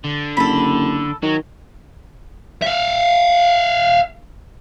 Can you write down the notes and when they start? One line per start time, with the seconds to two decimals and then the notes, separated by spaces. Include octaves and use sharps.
0.05 D3
0.37 F#1 A4 B5
1.23 D#3 F#3
2.62 E5 F5